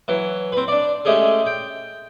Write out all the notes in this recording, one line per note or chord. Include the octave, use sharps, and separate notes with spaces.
E3 F#3
C4 B4
D4 D5
G#3 A3 C#4 G4 G#4
G5